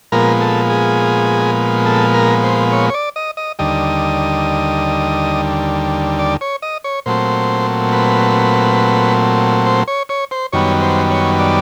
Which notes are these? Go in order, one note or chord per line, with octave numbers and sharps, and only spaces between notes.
A#2 F3 G#3 B3 A#4
A4
G#4
A4
A#4
C5
C#5
C#5
D5
D#5
D#5
D#2 D3 G3 D#5
D5
C#5
D#5
C#5
A#2 F#3 A3 C4 C5
B4
C5
C#5
C#5
C5
F#2 D#3 G3 B3 C#5
C5
C#5
D5